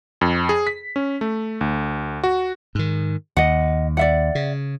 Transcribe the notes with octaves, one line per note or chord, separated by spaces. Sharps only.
F2
G#4
B6
C#4
A3
D2
F#4
G#2 D#3
D#2 D#5 F#5
D5 E5 F#5
C#3